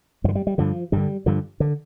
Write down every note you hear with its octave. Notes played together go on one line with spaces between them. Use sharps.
G2 D3 F3
G3
G3
G2 D3 F3
G2 D3 G3
G2 D3 F3
D3